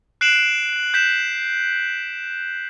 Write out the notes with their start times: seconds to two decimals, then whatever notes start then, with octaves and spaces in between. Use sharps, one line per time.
0.21 F#6 C7 D7 E7 F#7
0.94 G6 B6 E7